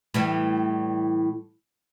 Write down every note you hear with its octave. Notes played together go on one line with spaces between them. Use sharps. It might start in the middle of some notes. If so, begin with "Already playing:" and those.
A2 E3 G3